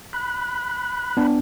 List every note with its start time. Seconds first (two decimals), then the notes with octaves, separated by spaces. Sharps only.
0.13 B5 F#6
1.17 B3 D4